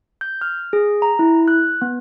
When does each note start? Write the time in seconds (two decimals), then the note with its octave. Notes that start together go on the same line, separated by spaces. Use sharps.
0.21 G6
0.41 F6
0.73 G#4
1.02 A#5
1.19 E4
1.48 F#6
1.82 B3